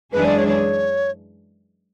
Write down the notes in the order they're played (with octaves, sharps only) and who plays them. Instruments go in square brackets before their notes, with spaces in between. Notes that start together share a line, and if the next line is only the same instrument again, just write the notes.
[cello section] F#2 E3 G#3 D4 G#4 [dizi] B4
[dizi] D5
C#5
C#5